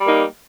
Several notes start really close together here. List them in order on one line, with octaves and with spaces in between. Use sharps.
G3 A#3 D#4